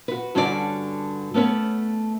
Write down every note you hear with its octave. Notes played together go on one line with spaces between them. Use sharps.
F#4 B4
G2 D3 C#4 F#4 G4 D5
A3 B3 C#4 B4